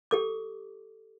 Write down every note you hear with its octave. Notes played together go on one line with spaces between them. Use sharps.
G4 A4 D6